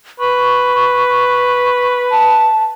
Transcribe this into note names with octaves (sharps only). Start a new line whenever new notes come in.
B4 C#6
A5